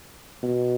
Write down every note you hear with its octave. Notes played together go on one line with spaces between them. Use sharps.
B2